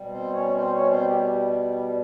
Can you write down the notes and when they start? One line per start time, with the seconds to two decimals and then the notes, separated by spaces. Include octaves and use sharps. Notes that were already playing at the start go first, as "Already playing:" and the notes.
Already playing: B2 G3
0.10 C4 C5
0.33 C#4 C#5
0.55 C4 C5
0.73 C#4 C#5
0.90 C4 C5
1.07 G4